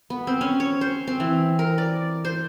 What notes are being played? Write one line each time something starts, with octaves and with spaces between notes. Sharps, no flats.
B3
C4
C#4
C#5
C5
C4
E3
A#4
D5
C5